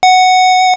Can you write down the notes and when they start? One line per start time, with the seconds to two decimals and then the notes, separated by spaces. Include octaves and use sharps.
0.03 F#5